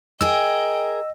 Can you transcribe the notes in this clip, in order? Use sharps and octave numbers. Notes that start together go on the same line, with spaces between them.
G#4 A#4 D#5 G5 E6